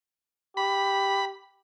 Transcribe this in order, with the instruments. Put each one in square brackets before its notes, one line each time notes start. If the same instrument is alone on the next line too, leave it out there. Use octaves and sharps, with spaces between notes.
[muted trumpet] G4 [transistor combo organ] B5